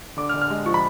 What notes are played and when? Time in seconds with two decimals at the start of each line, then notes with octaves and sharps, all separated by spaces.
0.17 D3 D6
0.29 F6
0.34 D3
0.41 F6
0.50 G#3
0.66 F3 C#6
0.74 B5